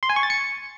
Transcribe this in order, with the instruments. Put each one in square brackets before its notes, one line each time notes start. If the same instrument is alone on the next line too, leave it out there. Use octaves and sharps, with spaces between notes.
[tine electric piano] C6
G#5
C#6
A6
C#7